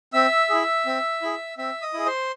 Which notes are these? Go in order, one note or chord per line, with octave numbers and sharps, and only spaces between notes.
C4 E5 E6
E4 G#4
C4
E4 G#4
C4 E5 E6
D#5 D#6
E4 G#4
C5 C6